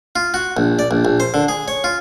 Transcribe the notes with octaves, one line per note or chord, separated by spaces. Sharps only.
F4
F#4
A#1
D5
A#1
A#1
C5
D3
G#4
C#5
F4